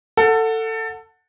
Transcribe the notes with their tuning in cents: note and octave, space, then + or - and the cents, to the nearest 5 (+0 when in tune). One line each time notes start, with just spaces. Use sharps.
A4 +20 F#5 -10